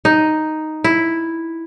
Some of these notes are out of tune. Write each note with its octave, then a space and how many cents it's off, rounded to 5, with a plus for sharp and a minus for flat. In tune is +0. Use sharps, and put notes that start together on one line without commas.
D#4 +0
E4 +0